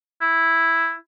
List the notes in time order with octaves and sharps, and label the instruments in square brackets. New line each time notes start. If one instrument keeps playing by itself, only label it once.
[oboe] E4